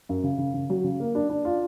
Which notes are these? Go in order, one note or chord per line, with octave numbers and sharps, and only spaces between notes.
F#2
C#3
C#3
C#3
F#3
C#3
A#3
D4
D4
F4